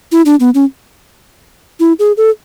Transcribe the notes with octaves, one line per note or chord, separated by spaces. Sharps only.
E4
D4
B3
C#4
E4
G#4
A4